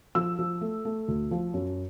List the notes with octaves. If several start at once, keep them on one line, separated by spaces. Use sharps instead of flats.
F3 E6
F3
A3
A3
D2
F3
F#2